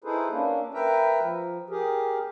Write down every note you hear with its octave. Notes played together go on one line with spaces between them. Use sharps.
D#4 E4 G#4 A4 B4 C5
A#3 C#4 D4
A#4 B4 E5 G5 A#5
F3
G4 G#4 A#4